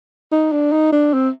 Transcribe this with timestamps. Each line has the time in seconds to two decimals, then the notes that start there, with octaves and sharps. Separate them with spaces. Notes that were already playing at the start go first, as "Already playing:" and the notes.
0.32 D#4
0.52 D4
0.72 D#4
0.92 D4
1.14 C4